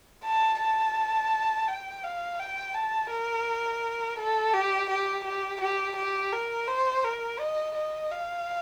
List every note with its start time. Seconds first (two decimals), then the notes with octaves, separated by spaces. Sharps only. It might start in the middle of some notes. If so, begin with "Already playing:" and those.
0.24 A5
0.60 A5
1.68 G5
2.04 F5
2.39 G5
2.74 A5
3.11 A#4
4.19 A4
4.54 G4
4.90 G4
5.25 G4
5.61 G4
5.97 G4
6.33 A#4
6.68 C5
7.05 A#4
7.40 D#5
7.76 D#5
8.11 F5